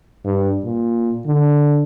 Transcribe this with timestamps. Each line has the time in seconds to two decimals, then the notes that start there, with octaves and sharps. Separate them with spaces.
0.25 G2
0.64 A#2
1.27 D3